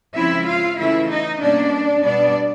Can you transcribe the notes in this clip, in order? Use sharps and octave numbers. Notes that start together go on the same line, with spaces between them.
C#3 F3 G#3 C4 E4 E5
F4 F5
C#3 E3 A3 C#4 E4 E5
D#4 D#5
B2 G3 A#3 C#4 D4 D5
B2 G3 B3 D4 D5